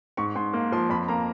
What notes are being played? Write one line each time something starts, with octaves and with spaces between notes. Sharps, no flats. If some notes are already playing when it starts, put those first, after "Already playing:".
G#2 C#6
G#2 C6
A#3
F3 C6
F2 B5
A#3 A#5